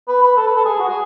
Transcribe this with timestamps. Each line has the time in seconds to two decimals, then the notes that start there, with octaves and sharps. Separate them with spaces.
0.09 B4
0.23 B4
0.37 A4
0.47 B4
0.56 A4
0.65 G#4
0.80 F#4
0.89 G#4